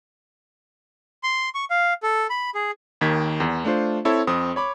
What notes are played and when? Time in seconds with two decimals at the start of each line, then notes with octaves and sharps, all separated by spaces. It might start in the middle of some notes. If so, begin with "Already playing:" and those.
1.23 C6
1.55 C#6
1.70 F5
2.03 A4
2.30 B5
2.55 G#4
3.01 D#2 D#3 G#6 B6
3.40 E2
3.65 A3 D4 F4 C5
4.05 C4 E4 A4 C#5
4.27 F2 C4 D#6
4.56 C#5 B5 D6